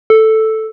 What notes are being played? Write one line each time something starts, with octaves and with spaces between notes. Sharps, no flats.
A4